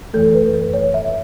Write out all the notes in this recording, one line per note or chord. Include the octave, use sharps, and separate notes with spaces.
F#2 E3 A3 A4
B4
B4
C#5
E5